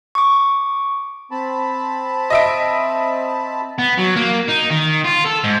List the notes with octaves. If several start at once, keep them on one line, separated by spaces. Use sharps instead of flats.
C#6 D6
C4 A5 B5
D#5 E5 D7
B3
F#3
A#3
D#4
D#3
F4
A4
G#2